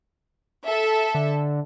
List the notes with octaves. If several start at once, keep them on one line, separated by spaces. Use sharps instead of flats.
A4 E5
D3